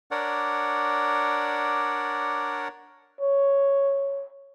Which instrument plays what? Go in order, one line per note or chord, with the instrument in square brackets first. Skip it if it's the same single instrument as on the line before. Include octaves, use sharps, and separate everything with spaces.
[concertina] D4 A#4 C#5 D5 F#5
[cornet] C#5